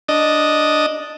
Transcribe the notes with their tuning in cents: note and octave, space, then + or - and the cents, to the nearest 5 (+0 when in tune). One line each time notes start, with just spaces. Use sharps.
D4 +0 D#5 +0